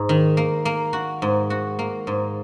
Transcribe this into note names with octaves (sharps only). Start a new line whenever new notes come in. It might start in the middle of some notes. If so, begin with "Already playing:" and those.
Already playing: G#2
D#3
A#3
A#3
F#4
G#2
F#4
A#3
G#2